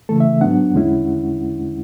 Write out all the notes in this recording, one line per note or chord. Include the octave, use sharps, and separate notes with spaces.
C#3 E3 A3 A4
E5
G#2 F#3 B3 D4 F#5
E2 D3 G#3 C#4 E4